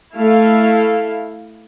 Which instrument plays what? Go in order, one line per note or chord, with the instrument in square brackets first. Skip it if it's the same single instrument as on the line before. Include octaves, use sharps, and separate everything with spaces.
[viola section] A3 E4 F5